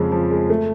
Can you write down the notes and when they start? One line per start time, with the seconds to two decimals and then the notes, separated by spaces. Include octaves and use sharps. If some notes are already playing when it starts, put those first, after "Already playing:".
Already playing: F2 C#3 F3 G#3
0.12 F3
0.31 G#3
0.50 A3